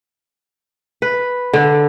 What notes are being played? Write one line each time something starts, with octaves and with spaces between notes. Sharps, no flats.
B4
D3